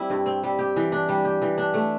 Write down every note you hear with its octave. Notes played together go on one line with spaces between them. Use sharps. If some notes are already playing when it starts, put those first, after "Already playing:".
Already playing: G3 C4 E4
G2
C4
G3
G4
E3
D4
G3
G4
E3
D4
A3